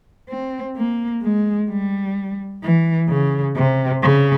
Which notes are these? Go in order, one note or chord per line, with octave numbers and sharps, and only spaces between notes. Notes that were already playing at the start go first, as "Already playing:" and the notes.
C4
A#3
G#3
G3
E3
C#3
C3
C#3